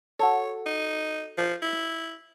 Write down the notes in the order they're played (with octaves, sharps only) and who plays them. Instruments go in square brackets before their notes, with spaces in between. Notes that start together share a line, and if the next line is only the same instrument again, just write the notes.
[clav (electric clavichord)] F#4 A4 [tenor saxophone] C#5
[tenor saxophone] D#4
F3
E4